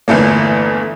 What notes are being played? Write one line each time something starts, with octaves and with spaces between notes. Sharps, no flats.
G1 E2 A3 A#3